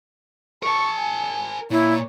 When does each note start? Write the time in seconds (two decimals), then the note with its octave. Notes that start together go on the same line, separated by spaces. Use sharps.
0.63 A#4 A5 C#6
0.98 G#5
1.71 A#2 E4 C#5